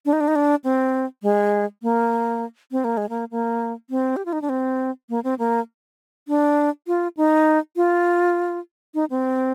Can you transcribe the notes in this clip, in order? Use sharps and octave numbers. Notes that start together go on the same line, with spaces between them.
D4
D#4
D4
D#4
D4
C4
G#3
A#3
C4
A#3
G#3
A#3
A#3
C4
G4
F4
D#4
D4
C4
A#3
C4
A#3
D4
F4
D#4
F4
D#4
C4